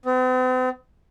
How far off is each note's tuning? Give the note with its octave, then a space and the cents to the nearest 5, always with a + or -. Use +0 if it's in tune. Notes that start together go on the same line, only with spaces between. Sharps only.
C4 -45